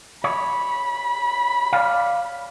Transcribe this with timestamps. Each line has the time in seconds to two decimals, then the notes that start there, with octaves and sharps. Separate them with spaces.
0.24 C#5 B5
1.73 C#5 D5 F5